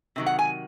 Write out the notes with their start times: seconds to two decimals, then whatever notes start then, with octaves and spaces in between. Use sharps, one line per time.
0.16 C3 D#3 F#3
0.26 F#5
0.39 G#5